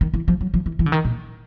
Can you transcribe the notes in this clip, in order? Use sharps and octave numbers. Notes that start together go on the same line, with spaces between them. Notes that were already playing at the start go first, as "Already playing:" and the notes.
D#3
E3
F3
F#3
F3
E3
E3
D3
D#3
A#2